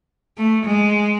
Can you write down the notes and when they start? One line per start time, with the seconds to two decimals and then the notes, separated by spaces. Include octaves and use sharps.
0.37 A3
0.66 G#3